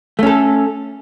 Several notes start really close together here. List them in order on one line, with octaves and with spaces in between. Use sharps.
A3 C#4 A4